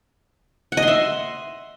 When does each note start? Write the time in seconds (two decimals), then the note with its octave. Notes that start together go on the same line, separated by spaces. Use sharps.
0.72 F#5
0.77 D#5
0.82 C6
0.88 E5